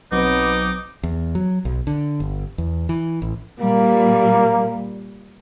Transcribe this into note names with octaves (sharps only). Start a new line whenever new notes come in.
B1 F#3 B3 C4 D#4 D6
E2
F#3
B1
D3
G1
E2
E3
A1
A#2 G3 A#3